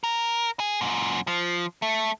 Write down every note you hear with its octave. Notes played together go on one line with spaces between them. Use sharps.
A#4
G#4
F#2 A#2
F3
A3